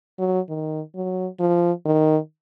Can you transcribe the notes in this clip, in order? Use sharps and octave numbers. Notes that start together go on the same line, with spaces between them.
F#3
D#3
F#3
F3
D#3